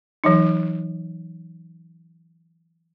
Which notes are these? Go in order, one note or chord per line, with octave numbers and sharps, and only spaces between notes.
E3 F#3 D#4